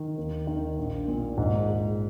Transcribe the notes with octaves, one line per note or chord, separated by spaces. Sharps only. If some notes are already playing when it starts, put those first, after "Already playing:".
Already playing: D#3
D#2
D#3
A#1
A#2
G#2
G#3